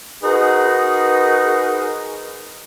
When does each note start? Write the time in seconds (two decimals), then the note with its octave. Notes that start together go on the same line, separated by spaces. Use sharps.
0.23 D#4 F#4 G#4 A#4 B4